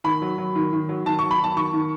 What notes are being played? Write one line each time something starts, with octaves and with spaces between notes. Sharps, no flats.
D#3 B5
F#3
F#3
D#3
D#3
F#3
D#3 A5
F#3 C#6
B5
F#3 A5
D#3 C#6
D#3